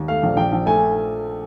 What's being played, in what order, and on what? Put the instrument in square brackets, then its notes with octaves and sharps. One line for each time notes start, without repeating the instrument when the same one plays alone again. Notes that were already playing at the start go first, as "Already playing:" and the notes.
Already playing: [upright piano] D#2
A3 F5
A#1
A#1 G5
A#1
A3 G#5